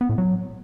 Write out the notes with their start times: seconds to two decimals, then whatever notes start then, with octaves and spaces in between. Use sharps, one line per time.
0.01 B3
0.09 A2
0.18 F#3